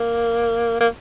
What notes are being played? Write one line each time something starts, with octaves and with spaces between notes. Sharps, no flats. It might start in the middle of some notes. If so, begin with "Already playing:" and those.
Already playing: A#3
A#3